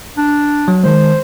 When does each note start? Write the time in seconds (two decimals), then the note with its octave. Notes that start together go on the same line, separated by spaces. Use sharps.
0.18 D4
0.68 F#3
0.84 D#3 G#3 C5